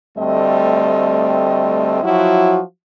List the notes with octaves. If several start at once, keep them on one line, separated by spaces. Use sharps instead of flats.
D2 G3 A3 C4 D#5
F3 F#3 E4 F#4